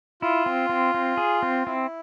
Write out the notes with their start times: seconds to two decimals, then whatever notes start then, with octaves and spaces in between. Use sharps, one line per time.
0.22 E4 F4
0.46 C4
0.69 C4
0.94 C4
1.17 G#4
1.43 C4
1.66 C4 E4